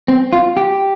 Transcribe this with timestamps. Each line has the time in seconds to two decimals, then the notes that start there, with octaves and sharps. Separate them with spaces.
0.08 C4
0.33 F4
0.57 G4